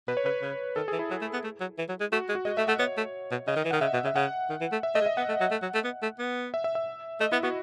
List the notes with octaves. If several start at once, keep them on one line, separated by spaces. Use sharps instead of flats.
B2 B4
C#5
C#3 B4
C#3
D#3 A4
E3 G#4
E4
F#3
A3
B3
A3
F#3
E3
F#3
G#3
A3 F#4
G#3
F#4
G#3 D#5
A3 E5
A3 F#5
B3 C#5
A3
B2
C#3 D#5
D#3
E3
D#3 F#5
C#3 E5
B2
C#3 E5
C#3 F#5
D#3
E3
A3
E5
A3 D#5
G#3
E5
B3 F#5
A3
F#3
A3
F#3
A3
B3
A3
B3
E5
E5
E5
A3 D#5
B3 E4
B3 F#4